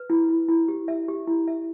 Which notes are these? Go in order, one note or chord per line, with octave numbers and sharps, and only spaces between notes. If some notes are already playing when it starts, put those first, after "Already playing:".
Already playing: B4
E4
E4
E4
G4
E5
G4
E4
E5